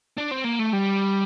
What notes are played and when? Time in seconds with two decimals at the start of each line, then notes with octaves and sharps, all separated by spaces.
0.18 D4
0.31 C4
0.45 A#3
0.60 A3
0.73 G3